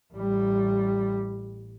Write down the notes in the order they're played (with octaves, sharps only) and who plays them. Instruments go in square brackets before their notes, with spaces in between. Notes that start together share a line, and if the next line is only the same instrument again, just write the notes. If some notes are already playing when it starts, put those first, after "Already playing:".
[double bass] A1 G3